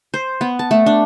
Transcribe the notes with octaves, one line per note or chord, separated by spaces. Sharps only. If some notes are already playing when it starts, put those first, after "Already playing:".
C5
B3
A5
A3
D4